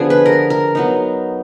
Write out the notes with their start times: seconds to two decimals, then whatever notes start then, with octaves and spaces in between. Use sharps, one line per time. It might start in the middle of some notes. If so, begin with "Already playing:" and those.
Already playing: D3 F3 B3 D4 G#4
0.10 B4
0.26 A#4
0.50 A#4
0.75 F#3 B3 D#4